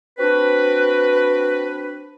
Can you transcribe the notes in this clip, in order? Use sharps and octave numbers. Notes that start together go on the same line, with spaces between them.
C4 D4 F#4 B4